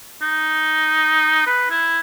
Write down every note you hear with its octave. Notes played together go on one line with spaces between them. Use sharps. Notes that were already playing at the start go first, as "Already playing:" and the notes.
D#4
B4
E4